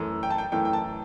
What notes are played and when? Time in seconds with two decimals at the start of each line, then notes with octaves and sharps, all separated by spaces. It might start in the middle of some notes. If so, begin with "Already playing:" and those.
Already playing: F#2 E3 A3
0.23 G5
0.30 A5
0.38 G5
0.52 F#2 E3 A3 G5
0.65 G5
0.73 A5